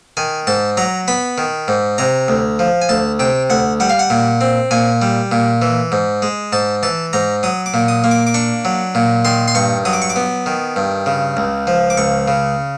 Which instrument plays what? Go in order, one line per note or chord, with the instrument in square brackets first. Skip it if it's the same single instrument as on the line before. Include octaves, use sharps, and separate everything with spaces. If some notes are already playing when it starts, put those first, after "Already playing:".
[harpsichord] D#3 G#5
G#2 A5
F#3 A#5
B3 B5
D#3
G#2
C3 A#5
D2
F3
G#5
D2 A5
C3 G5
D2 F#5
G3 F#5
F5
F#5
A#2
C4
A#2 G#5
G3
A#2
E3
G#2
G#3
G#2 A5
E3 A5
G#2 A#5
F#3 D#6
D6
A#2
D#6
A#3
D6
D6
D4 C#6
F#3
A#2
D#3 C6
C6
G2 C#6
F#3 D#6
D6
C#6
D6
B3
D#3
G2
C#3
C#2
F3
D6
C#2 C#6
C#3